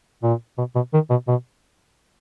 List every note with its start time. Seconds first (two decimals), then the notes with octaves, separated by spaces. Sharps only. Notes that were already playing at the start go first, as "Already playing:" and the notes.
0.23 A#2
0.58 B2
0.75 B2
0.93 D#3
1.10 B2
1.28 B2